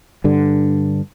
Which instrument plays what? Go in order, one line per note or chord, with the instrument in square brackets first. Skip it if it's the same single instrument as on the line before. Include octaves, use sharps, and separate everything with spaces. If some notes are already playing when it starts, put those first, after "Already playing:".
[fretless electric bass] G2 D3